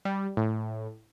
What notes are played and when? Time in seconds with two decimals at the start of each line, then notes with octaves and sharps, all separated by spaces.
0.05 G3
0.37 A2